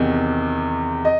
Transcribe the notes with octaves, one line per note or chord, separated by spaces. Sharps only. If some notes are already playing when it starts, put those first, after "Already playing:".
Already playing: E2 C3 D#3
D#5